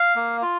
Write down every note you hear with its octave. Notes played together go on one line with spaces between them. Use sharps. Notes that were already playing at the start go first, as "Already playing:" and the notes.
Already playing: F5
A#3
F4